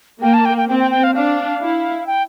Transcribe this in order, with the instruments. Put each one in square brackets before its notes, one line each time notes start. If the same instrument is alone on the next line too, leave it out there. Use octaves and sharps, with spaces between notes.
[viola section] A#3 [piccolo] G5
[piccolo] A5
G5
G5
[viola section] C4 [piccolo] G5
[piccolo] G5
G5
F5
[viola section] D4 [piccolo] F5
[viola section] E4
[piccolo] G5